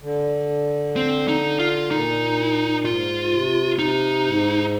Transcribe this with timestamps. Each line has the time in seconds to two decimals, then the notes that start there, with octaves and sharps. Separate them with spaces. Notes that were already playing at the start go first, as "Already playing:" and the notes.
0.02 D3
0.96 C4
1.28 D#4
1.59 F4
1.91 A#2 D#4
2.85 G#2 F4
3.32 C3
3.79 C3 D#4
4.26 G#2